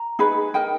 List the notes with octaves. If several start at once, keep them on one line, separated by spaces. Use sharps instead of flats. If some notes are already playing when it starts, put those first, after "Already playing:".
Already playing: A#5
D#4 G#4 B4
D#4 A#4 G5